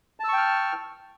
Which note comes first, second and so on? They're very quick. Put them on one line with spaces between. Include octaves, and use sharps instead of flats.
A5 E6 C#6 G5 F6